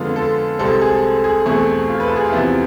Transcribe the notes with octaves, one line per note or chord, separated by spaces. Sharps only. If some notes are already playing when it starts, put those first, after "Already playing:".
Already playing: F2 D3 G#3 B3 F4
A4
C2 C3 G#3 C4 A4
G#4
G#4
E2 B2 A3 C4 G#4
F4
B4
A4
G#4
F4
E2 C3 F3 B3 E4